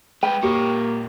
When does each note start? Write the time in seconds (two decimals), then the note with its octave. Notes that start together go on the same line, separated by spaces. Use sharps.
0.23 G#3 B4 G5
0.43 A#2 A#3 G4 C#5